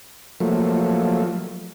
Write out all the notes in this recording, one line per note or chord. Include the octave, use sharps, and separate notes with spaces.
F3 F#3 A3 A#3